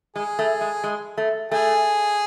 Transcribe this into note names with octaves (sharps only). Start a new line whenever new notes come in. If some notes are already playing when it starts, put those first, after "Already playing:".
G#3 G#4
A3
G#3
G#3
A3
A3 G#4